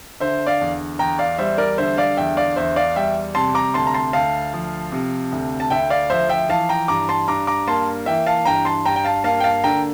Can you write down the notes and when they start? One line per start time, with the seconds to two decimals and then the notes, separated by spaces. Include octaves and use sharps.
0.20 D3 C5 E5
0.47 D5 F5
0.61 E2
0.99 E2 G5 A#5
1.19 D5 F5
1.39 G3 C5 E5
1.58 A#4 D5
1.78 D3 C5 E5
1.98 D5 F5
2.17 E2 E5 G5
2.37 D5 F5
2.56 E2 C5 E5
2.76 D5 F5
2.96 G3 E5 G5
3.35 C3 A5 C6
3.55 A#5 D6
3.74 D2 A5 C6
3.87 A#5
3.94 A5 C6
4.13 D2 F5 A5
4.53 F3
4.92 C3
5.32 D2
5.60 A5
5.70 D2 E5 G5
5.90 D5 F5
6.10 F3 C5 E5
6.29 E5 G5
6.49 E3 F5 A5
6.69 G5 A#5
6.88 G2 A#5 D6
7.09 A5 C6
7.28 G2 A#5 D6
7.47 A#5 D6
7.68 A#3 A5 C6
8.06 E3 E5 G5
8.26 F5 A5
8.46 G2 G5 A#5
8.65 A5 C6
8.85 G2 G5 A#5
8.96 G5
9.04 F5 A5
9.24 A#3 F5 A5
9.40 G5
9.44 F5 A5
9.64 D3 G5 A#5